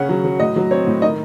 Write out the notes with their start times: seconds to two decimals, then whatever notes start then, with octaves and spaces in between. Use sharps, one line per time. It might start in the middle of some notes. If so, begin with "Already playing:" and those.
Already playing: C#3 C#4 F#5
0.09 F#3
0.25 F#3
0.40 A2 D#5
0.56 F#3
0.71 C4 C#5
0.87 A2
1.02 D#3 D#5